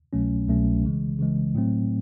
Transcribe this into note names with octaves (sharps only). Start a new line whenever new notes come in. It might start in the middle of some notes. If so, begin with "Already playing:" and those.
C2 B2 F#3 A3 C#4
C2 B2 F#3 A3 C#4
C#3 E3 G#3
C#3 E3 G#3
A2 F#3 A3 C4